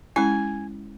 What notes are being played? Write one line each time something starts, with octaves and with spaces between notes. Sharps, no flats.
G#3 C#4 E4 G#5